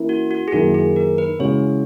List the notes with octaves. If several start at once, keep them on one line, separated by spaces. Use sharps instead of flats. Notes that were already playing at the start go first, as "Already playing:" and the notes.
Already playing: E3 A#3 C#4 E4
F#4
F#4
G#4
F#2 D#3 A#3 E4 F#4
G#4
A#4
B4
C#3 E3 G#3 C#4 F#4 C#5